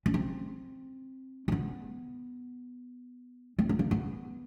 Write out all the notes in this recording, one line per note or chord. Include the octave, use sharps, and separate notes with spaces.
C#4
C4
C4
B3
C4
B3
A#3
B3